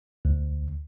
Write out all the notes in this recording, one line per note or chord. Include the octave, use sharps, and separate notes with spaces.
D2